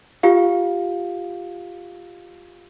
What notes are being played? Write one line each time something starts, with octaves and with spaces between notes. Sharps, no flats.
F4 G4 F5